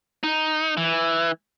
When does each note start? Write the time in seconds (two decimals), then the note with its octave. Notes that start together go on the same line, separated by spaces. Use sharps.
0.23 D#4
0.77 E3